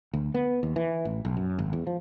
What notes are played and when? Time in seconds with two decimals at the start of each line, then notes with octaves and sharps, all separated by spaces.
0.14 D2
0.34 B3
0.63 D#2
0.76 E3
1.05 A1
1.25 B1
1.37 F#2
1.59 G#1
1.73 E2
1.87 F3